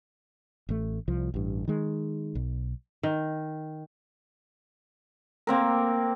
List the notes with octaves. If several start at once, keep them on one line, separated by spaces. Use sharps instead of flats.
A1 A3
C2 F3
A1 G2
D#3 G#3
B1
D#3
A#3 C4 A#4